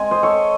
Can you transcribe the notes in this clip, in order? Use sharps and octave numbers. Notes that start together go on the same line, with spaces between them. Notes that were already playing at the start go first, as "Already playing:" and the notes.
Already playing: G#3 C4 G#5
C5 D#5
A4 C#5